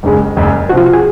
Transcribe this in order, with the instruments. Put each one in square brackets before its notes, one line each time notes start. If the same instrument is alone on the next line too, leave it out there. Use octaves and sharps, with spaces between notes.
[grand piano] F#1 F#2 C#3 G#3
F#1 F#2 C#3 G#3
[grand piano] C3 F3 C4 [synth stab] F#4
[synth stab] F4
F#4
G#4